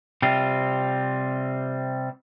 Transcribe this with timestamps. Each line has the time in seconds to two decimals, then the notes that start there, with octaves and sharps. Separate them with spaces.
0.22 C3 G3 C4 F4